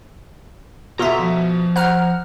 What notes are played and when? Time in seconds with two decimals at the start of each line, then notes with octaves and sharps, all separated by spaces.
0.99 B2 F4 A4 E5 A#5
1.19 F3
1.76 C5 F#5 A#5 F6